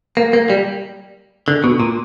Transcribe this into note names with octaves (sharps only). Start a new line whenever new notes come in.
A#3
A#3
G3
D3
B2
A#2